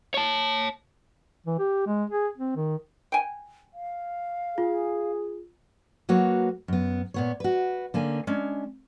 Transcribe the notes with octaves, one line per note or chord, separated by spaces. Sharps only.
C#5 A5
E3
G4
G#3
G#4
C4
D#3
G5 G#5
F5
F4 G#4
F#3 A#3 F#4 B4 C#5
F#2 B3
A#2 B3 C#5
F#4 B4
D3 A#3 C#4 G#5
G#3 C#4 D4